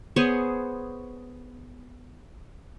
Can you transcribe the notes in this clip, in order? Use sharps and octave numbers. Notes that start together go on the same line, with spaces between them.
B3 G#4 C5 C#5